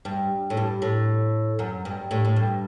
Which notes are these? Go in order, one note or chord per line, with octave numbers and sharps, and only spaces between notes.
G2
A2
G2
A2
F#2
G2
A2
A2
G2